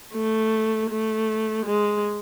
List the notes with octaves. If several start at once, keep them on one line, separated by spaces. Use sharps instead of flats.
A3
A3
G#3